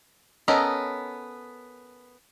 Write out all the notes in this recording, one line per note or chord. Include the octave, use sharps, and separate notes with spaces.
B3 C#4 A4 A#4 D#5